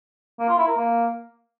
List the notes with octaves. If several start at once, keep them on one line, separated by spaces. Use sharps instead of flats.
A#3
F4
E4
A#4
A#3